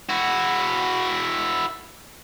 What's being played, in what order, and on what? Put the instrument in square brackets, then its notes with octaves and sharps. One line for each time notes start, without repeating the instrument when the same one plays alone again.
[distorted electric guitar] E4 F#4